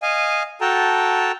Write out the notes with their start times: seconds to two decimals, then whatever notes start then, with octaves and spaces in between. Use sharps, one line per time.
0.02 D#5 F5 G#5
0.61 F#4 A4 G5 A5 A#5